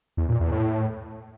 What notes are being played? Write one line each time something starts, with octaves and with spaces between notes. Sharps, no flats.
E2
A#2
E2
A2